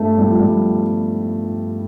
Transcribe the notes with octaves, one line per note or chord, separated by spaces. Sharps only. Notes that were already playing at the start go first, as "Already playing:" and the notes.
Already playing: G2 A3
G3
F3
G3